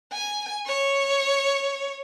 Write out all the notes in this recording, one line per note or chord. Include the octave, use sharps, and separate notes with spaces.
G#5
C#5